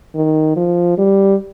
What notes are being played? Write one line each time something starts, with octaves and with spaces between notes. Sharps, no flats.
D#3
F3
G3